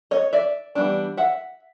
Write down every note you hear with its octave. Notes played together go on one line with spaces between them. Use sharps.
C#5 D#5
D5 E5
E3 G3 B3 D4
E5 F#5